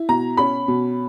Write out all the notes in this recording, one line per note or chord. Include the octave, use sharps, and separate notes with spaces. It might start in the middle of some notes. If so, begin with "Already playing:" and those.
Already playing: E4
B2 A#5
C#4 B5
B2